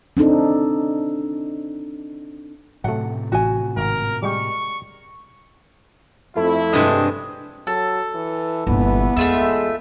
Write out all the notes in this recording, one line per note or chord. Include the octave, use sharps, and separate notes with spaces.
C4 D4 D#4 A4
A2 C3 F#3 A3 F#5
A1 F#4 G#5
G#1 A#4
G3 G#3 G4 C#6
F2 A3 E4
G2 C3 G#3 D4 G4 D#5
F#3 A4
E3
G1 A#2 E3 B3
E2 G#3 A3 F4 E5